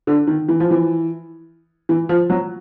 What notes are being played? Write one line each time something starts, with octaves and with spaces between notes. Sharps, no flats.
D3
D#3
E3
F3
E3
E3
F3
F#3